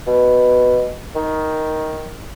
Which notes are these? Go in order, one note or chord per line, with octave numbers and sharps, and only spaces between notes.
B2
D#3